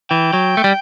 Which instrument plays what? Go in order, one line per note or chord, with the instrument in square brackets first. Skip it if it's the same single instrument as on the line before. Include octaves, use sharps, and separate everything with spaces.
[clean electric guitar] E3 [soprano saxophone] G5
[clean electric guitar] F#3
A3
G3